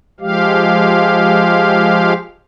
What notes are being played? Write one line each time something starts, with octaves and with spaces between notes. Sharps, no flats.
F3 G#3 G4 F5